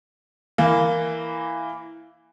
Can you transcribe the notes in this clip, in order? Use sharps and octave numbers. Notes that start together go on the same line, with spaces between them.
E3 A#3